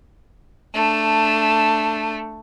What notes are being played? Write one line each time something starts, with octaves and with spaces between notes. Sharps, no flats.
A3 D4